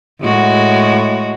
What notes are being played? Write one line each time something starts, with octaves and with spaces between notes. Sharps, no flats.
A2 G#3 F#4